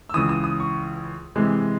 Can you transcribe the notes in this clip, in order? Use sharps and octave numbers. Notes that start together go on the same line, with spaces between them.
E6
C#2 C#3 E3 D#6
D#6
D#6
C#6
C3 E3 G#3